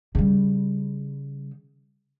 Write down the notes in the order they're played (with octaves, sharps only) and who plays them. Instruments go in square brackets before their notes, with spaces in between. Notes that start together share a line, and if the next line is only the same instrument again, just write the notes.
[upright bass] C#3 G3